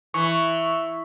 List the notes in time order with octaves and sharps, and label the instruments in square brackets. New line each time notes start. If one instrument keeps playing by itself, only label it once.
[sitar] E3 [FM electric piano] C#6